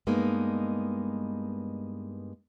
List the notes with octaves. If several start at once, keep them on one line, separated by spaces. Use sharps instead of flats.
G2 G#3 A#3 B3 D#4